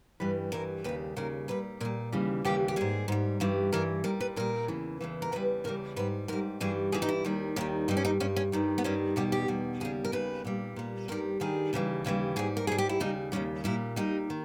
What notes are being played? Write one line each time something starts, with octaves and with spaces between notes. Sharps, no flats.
G2 E3 G3 B4
G2 E3 G3 A#4
D#2 C#3 G3 B4
D#2 C#3 G3 A#4
A#2 G3 B4
A#2 G3 A#4
D#2 C#3 E3 G3
D#2 C#3 E3 G3 G4
G4
G#2 G3 G#4
G#2 G3
G2 E3 G3
G2 E3 G3 A#4
A#2 G3 A#4
B4
A#2 G3 A#4
E2 C#3 E3
E2 C#3 E3
A#4
E2 C#3 E3 G3 B4
E2 C#3 E3 G3 A#4
G#2 G3 B4
G#2 G3 A#4
G2 E3 G3 G#4
G2 E3 G3 G#4
D#4
E4
D#2 D#3 G3
D#2 D#3 G3 G4
G2 G3 D#4
C#4
D#4
G2 G3 C#4
C#4
G2 D#3 G3
B3
G2 D#3 G3 C#4
E2 B2 G3 G4
G4
E2 B2 G3
D#2 C#3 G3 G#4
A#4
D#2 C#3 G3 B4
A#2 G3
A#2 G3
G2 D#3 G3 A#4
G2 D#3 G3 G#4
D#2 C#3 E3 G3
D#2 C#3 E3 G3
G#2 G3 G#4
A#4
G#2 G3 G#4
G4
E4
D#2 C#3 G3 D#4
D#2 C#3 G3 C#4
A#2 G3 E4
A#2 G3 D#4
D#3